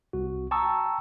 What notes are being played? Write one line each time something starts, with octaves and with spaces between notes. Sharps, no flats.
C2 F#4
G5 A5 A#5 C#6 D#6 E6